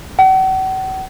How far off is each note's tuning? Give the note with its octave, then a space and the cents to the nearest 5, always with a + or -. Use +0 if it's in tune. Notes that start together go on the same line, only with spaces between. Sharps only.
F#5 +45